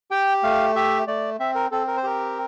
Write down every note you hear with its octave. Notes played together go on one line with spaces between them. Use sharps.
G4 G5
A3 F5
G4 E5
A3 D5
C4 E5
A#4
C4 A4
A#4
C5
G4 A#4